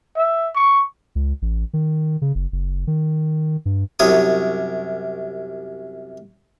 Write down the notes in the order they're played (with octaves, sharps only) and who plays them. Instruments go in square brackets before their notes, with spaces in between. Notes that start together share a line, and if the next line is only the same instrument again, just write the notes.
[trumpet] E5
C#6
[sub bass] C#2
A1
D#3
C#3
F#1
F#1
D#3
G2
[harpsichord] C2 F#2 C#5 D#6